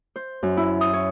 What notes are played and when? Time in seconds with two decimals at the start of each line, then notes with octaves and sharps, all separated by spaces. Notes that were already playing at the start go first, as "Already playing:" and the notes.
0.16 C5
0.43 F#2
0.57 E4
0.81 D#6
0.93 C#5